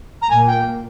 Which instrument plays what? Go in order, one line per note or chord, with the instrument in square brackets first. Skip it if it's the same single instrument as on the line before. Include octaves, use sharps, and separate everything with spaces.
[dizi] A#5
[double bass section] A#2 A#3 [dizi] G#5
[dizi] G5